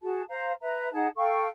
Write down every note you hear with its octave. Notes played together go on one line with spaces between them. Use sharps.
F#4 G#4 A5
C5 F5 A#5
B4 E5 A#5
D#4 G#4 F#5 A5
A4 F5 G5 C#6